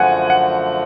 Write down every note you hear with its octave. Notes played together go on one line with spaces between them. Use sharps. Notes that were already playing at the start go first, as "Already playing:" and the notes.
Already playing: F#2 D3 F3 A3 F#5 G#5
F#5